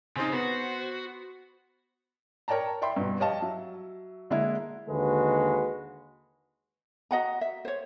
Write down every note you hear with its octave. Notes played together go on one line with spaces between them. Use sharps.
C#3 C4 D#4 C5
B3 F#4
A#4 C#5 D5 G5 A5 A#5
D5 E5 G5 B5 C6
G2 B2
G4 C#5 D#5 F5 A5
F#3 E5
D3 G#3 A#3 E4
D#2 D3 G#3 F#4 A4 B4
F#4 D#5 F#5 A#5
E5
C5 C#5